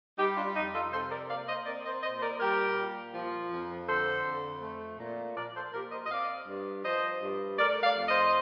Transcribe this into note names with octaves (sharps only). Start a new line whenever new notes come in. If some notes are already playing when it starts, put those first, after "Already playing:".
G3 D#4 G4
D4 F4
F2 D#4 G4
F4 A4
C3 A4 C5
A#4 D5
A#3 D5 F5
C5 D#5
C4 A#4 D5
C5 D#5
A#2 C5 D#5
C5
A#4 D5
G3 G4 A#4
A#2
F3
F2
D3 A4 C5
F2
A3
A#2
F3 A#4 D5
A4 C5
A#2 G4 A#4
C5 D#5
D#5
C4 D5 F5
G2
F3 C5 D#5
G2
A3 A#4 D5
D5 F5
F2
C5 D#5